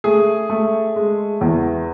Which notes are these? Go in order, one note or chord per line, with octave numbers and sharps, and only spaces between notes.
A3 G#4
A3
G#3
E2